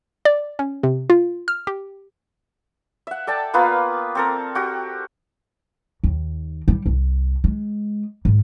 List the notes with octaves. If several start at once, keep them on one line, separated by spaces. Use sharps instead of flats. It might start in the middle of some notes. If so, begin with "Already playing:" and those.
D5
C#4
C3
F4
F6
G4
E5 F#5
A4 D5 G5 A5
A#3 B3 F4 B4
C4 A4 A#4
F#4 G4
D#2
G3
C2
G#3
G#2